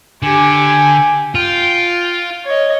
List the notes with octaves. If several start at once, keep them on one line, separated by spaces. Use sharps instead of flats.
D3 G4 G#5
F4 G5
C#5 D#5